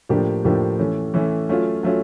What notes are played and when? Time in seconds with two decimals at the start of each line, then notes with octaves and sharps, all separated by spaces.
0.09 A2 F3 A#3 D4 G4
0.45 A2 F3 A#3 D4 G4
0.79 E3 A3 C#4
1.14 E3 A3 C#4
1.49 F#3 A3 C#4 F4
1.83 F#3 A3 C#4 F4